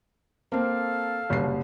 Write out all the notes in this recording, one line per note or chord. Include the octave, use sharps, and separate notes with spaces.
A#3 C4 A4 F5 A5
F#1 C2 C7